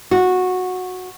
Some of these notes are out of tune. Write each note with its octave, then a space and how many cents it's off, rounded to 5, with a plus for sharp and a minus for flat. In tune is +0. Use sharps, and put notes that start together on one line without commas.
F#4 -15